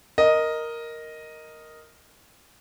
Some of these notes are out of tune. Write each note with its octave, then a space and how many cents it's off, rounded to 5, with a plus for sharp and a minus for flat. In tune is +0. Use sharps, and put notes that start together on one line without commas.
A#4 +0 D#5 +0